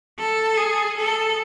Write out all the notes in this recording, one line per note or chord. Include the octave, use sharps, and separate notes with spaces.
A4
G#4
A4